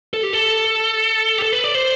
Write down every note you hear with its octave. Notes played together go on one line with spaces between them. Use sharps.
A4
G4
A4
G4
A4
B4
D5
C5